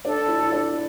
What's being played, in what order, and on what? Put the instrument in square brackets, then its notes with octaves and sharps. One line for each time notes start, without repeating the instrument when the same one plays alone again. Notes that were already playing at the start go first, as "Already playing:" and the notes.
[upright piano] D4 [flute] A4
[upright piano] E4
E4
D4